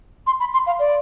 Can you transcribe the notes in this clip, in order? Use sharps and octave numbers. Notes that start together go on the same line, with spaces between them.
C6
B5
C6
F5
D5